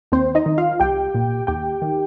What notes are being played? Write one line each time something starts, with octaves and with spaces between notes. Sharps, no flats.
D#2 C4 C5
D#4 D#5
D#3
F4 F5
C2 G4 G5
A#2
D#2 G4 G5
D#3